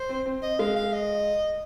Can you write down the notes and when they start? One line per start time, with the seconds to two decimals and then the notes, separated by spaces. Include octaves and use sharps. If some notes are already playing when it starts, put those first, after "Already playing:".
Already playing: C5
0.09 C4
0.26 C4
0.42 D#5
0.59 G#3 F5
0.76 F5
0.93 D#5